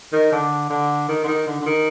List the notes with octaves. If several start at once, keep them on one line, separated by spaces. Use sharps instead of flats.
D#3
D3
D3
D#3
D3
D#3
D3
D3
D#3